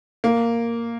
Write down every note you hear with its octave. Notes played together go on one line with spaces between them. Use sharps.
A#3